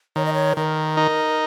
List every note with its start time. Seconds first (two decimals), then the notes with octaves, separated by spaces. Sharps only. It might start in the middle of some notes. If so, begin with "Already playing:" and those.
0.16 D#3 C#5
0.25 D#5
0.33 C#5
0.56 D#3 A#4
0.97 D#4